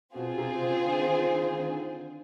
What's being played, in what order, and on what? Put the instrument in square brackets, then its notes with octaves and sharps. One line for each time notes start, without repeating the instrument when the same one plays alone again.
[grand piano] B2 [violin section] C4 F4 G#4 C5
[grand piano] C3
C#3
D3
D#3
D3
D#3
D3
D#3
D3